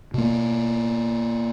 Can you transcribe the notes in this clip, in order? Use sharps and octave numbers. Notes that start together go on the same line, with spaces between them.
B2 A#3